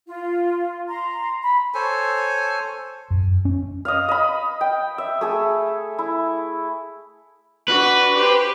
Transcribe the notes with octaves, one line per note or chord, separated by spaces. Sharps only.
F4
A#5 C6
B5
A4 C5 C#5 G#5
F#2
C#4
D#5 F5
D#5 B5
G5
E5
A3 G#4 A4
E4
D4 F#4 B4
G4 C5